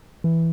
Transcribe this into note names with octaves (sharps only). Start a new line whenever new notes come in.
E3